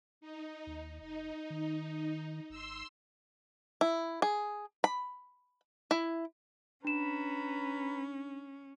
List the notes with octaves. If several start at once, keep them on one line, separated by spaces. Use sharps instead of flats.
D#4
D#2
F1 D#4
D#3
G#1 C6 E6
E4
G#4
B5
E4
C#4 D4 B4 A#5 B5 E7